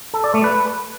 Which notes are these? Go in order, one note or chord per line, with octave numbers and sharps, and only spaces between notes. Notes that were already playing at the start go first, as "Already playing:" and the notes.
A4
D5
A3
B4